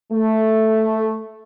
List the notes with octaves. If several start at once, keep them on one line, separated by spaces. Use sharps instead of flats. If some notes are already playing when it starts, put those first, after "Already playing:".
A3